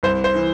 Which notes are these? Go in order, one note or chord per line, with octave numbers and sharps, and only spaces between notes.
C2 C5
C5
E3